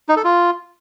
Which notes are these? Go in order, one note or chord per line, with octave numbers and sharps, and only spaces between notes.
D#4
A4
F4